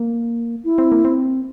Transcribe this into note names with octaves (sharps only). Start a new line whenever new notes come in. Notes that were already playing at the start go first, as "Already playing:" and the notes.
Already playing: A#3
E4
C4
A#3
C4